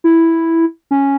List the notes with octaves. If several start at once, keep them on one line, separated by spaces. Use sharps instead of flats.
E4
C#4